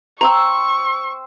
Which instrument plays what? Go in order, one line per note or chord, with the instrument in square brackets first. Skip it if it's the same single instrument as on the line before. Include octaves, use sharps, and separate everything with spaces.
[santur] C5 G5 E6 [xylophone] A#5 [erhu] C#6